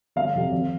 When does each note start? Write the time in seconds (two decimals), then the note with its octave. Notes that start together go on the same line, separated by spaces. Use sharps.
0.16 G1 F5
0.35 F2 C3 F3
0.52 G#1